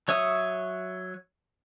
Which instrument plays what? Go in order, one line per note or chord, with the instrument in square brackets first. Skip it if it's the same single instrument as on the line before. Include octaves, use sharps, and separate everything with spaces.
[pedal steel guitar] F#3 C#5 E5 D#6